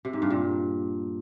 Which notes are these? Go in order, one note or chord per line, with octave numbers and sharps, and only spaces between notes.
C3
G#2
G2
A#2